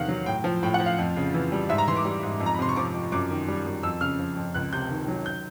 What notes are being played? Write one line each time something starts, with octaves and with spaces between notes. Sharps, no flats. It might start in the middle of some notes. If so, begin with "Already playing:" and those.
Already playing: E2 C3 D#3 F5 F#5
F#3
A2 G5
F3
A2 G5
F#5
F3
F5
F2
C#3
E3
G3
G#2 E5
A#5
E3 C6
D6
G3
G#2
F2
A#5
B5
C3 C6
C#6
F3 D6
F2
F#2 D6
D#3
G3
F#2
F2 E6
C#3 F6
F3
F2
C#2 F#6
C3 G6
D#3
F#3
G6